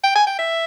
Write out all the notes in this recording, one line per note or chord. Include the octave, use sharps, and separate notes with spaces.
G5
G#5
G5
E5